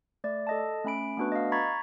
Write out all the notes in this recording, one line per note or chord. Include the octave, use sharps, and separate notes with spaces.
A3 D5
A4 D#5 A5
A3 C#4 B5 D7
A3 B3 D4 F#4 B4
D#5 F5
A#5 B5 C#6 G#6 A6 B6